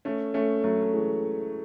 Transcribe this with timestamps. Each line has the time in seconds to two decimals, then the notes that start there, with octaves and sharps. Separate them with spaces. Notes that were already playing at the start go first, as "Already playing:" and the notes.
0.05 A3 C#4
0.34 A3 C#4
0.64 F#3 A3
0.83 A3
0.93 E3 G#3